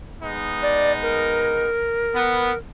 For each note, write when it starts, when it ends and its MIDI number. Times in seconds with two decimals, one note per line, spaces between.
0.23 1.69 56
0.23 1.69 59
0.23 1.69 63
0.62 0.92 74
1.02 2.57 70
2.15 2.52 59